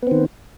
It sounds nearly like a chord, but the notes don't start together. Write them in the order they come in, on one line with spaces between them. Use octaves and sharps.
B3 C4 D#3